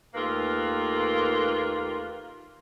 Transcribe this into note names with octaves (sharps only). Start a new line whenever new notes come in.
D#2 A3 A#3 F4 A#4 B4